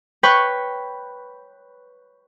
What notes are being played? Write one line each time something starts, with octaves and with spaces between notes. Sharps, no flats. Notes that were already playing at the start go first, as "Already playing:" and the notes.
B4 C#5 G5 B5 C#6 F#6